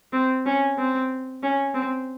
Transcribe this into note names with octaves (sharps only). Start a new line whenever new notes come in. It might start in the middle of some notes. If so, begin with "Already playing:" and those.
C4
C#4
C4
C#4
C4